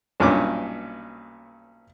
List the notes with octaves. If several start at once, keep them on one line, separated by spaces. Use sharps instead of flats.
B1 G2 A#2 C#4 D6